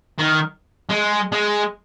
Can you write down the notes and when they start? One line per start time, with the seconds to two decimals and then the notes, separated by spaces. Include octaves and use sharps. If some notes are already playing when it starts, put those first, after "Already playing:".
0.18 D#3
0.89 G#3
1.32 G#3